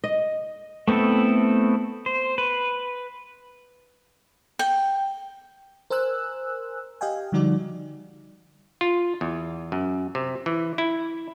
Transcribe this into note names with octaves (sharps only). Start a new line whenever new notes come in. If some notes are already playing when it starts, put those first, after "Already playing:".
D#5
A3 B3 C4 E4 A4
C5
B4
G5
A#4 C5 G#5 E6 F#6
G4 D#5 F5 G5 G#5
D3 F3 G3 D#4 F#4 D5
F4
E2
F#2
C3
E3
E4